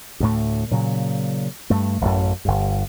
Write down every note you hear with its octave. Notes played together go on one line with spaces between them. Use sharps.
D2 A2 A3
A#2 C#3 F#3
G2 A3
A1 F#2
G1 G2